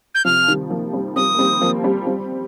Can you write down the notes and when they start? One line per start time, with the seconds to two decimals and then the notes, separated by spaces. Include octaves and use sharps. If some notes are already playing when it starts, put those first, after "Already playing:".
0.15 G6
0.25 C3 F3 F6
0.48 D#3 G3
0.70 F3 A#3
0.93 G3 C4
1.16 G3 C4 D#6
1.35 A#3
1.39 G3 C4
1.62 F3 A#3
1.84 G3 C4
2.07 G3 C4